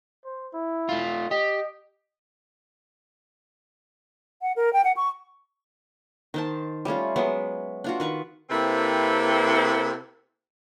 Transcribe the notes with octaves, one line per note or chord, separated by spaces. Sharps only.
C5
E4
A3 F4
G4 D#5
F#5
A#4
G5
F#5
C#6
D#3 C5 A5
G3 A3 C#4 F4
F#3 G#3 B3 E5
D4 F4 F#4
D#3 B4 C#6
C3 A#3 C4 E4 A4 B4